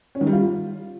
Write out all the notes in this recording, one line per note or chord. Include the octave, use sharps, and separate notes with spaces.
C#4
D#3
G3
F4